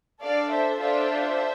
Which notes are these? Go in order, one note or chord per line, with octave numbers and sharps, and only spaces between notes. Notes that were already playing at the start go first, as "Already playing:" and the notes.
D4 A4 D5 F5
C5 E5
D4 F4 A4 C5 E5